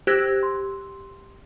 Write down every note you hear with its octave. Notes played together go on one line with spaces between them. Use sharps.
G4 C5 E6 F#6 G#6 A#6
C6